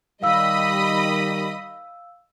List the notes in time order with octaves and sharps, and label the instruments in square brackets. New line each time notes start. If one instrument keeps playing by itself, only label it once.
[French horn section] D#3 G3 [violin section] D#5 B5 D#6 [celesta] F5 E6